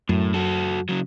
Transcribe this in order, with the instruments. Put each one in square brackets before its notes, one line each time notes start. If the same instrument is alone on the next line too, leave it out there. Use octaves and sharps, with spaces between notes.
[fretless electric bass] F#2 [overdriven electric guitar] A2
[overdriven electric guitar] F#4 A4
C#3 F#3